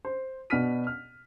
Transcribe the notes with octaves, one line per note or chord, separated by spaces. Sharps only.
C5
B2 B3 D4 F6 B6 D#7
F6